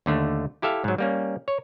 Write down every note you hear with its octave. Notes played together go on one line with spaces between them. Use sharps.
D#2 D3 A3
E4 G4 A4 E5 F5
G#2 F#3
G3 A#3 C#4
C#5